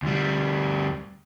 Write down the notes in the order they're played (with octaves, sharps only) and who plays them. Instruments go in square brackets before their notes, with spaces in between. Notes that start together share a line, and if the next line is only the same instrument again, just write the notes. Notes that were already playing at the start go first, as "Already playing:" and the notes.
[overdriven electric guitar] D2 G3